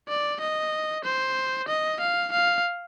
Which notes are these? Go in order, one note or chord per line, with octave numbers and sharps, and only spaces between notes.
D5
D#5
C5
D#5
F5
F5